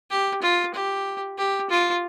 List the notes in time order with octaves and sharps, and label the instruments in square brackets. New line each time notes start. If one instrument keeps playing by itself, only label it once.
[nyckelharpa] G4
F4
G4
G4
F4